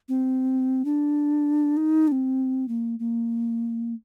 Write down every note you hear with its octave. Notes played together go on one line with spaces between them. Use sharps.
C4
D4
D#4
D4
C4
A#3
A#3